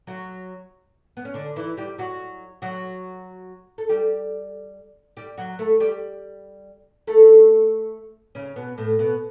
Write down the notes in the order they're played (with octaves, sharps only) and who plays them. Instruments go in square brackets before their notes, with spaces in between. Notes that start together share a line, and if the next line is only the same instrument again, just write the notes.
[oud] F#3 F#4
B3
C#4
D3 D4
E3 E4
G3 G4
F#3 F#4
F#3 F#4
A4
G3 G4
G3 G4
F#3 F#4
A3 A4
G3 G4
A3 A4
C#3 C#4
B2 B3
A2 A3
B2 B3